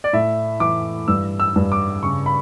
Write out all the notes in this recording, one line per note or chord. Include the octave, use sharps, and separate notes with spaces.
D5
A2 E5
E3 D6
G2 E6
E6
G2
D6
C#3 C#6
B5